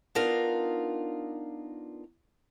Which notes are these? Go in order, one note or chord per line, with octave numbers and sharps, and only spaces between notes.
B3 D4 D#4 F4 A#4 D5